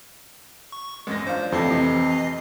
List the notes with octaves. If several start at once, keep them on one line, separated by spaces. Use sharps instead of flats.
C#6
A1 F#2 G#3 A#6
D4 F4 C5
F2 C3 E3 A3 E4 D#5 C7
C3